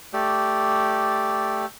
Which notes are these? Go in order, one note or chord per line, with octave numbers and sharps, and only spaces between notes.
A3 G4 D5